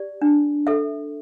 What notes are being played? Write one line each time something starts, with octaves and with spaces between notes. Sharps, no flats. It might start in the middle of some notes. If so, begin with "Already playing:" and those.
Already playing: G4 D5
D4
A4 E5